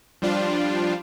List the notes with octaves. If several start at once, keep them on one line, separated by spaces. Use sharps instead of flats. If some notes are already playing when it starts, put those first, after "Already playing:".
F3 G3 D4 F4